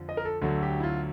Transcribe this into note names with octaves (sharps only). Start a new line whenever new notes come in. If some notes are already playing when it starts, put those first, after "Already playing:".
Already playing: F2 D3 F3
D#5
A#4
A4
D2 D3 F#3 A4
G4
E4
F4